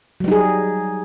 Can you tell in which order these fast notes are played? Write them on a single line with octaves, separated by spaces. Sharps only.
F#3 G3 D#4 G#4